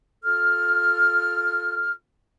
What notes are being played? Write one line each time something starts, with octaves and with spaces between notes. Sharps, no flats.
F4 A4 F6